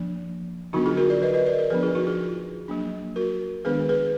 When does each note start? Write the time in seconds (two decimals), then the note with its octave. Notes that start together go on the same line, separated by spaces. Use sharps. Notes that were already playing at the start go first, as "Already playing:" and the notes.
Already playing: F3 A#3 D4
0.73 D3 F#3 B3 D4 D#4 F#4
0.86 F4 G#4
0.97 F#4 A#4
1.10 A#4 D5
1.22 B4 D#5
1.34 B4 D#5
1.46 A#4 D5
1.59 A#4 D5
1.70 F3 B3 D4 G#4 B4
1.83 F4 G#4
1.95 D#4 F#4
2.07 F4 G#4
2.68 F#3 A#3 D4
3.16 F#4 A#4
3.65 D#3 G#3 B3 D4 G#4 B4
3.89 G#4 B4